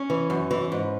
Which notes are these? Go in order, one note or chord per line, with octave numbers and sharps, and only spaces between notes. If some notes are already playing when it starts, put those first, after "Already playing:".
Already playing: C#4
E3
F#2
E3
G#2